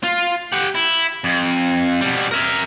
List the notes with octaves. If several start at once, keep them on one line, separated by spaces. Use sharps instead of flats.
F4
G4 F#5
E4
F2
B2 G3
A#4 E5